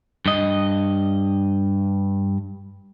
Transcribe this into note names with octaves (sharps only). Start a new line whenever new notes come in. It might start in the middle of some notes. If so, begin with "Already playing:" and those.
G2 D#5